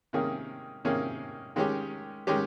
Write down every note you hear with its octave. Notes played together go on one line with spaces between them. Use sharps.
C3 D#3 A#3 C#4 G#4
C3 D#3 A#3 C#4 G#4
D#3 G#3 C#4 G4
D#3 G#3 C#4 G4